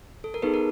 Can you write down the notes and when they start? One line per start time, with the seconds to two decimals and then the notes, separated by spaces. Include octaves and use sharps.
0.24 A4
0.34 A#4
0.42 B3 D#4 G#4 A4 B4
0.54 A#4